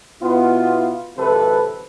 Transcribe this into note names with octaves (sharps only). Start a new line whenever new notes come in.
B2 B3 E4 F4
G#1 F2 C3 C4 A4 B4